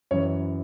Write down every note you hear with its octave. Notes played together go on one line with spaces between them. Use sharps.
F#2 E3 C#5